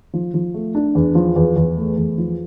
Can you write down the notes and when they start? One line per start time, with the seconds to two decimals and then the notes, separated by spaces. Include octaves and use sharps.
0.13 F3
0.34 F3
0.54 A3
0.75 D4
0.95 E2
1.15 F3
1.36 E2
1.56 E2
1.77 A3
1.97 E2
2.18 F3